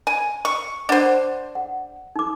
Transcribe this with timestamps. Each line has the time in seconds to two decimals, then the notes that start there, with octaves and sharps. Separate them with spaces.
0.07 G#5
0.45 C#6
0.89 D4 C5 D5 F#5 D6
1.55 F#5
2.16 D#4 D6